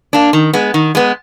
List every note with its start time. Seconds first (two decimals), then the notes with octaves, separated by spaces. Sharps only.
0.13 A#3 D4
0.33 D#3
0.53 G#3 B3
0.74 D#3
0.95 G#3 B3